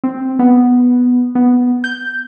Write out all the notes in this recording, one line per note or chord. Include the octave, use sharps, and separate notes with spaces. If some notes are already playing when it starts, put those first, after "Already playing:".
C4
B3
B3
G6